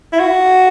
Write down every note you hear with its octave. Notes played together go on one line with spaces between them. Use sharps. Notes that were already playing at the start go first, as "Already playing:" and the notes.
E4
F#4